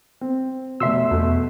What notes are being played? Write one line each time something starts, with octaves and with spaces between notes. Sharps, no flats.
C4
F1 B2 E5 C6 E6
E2 B2 A3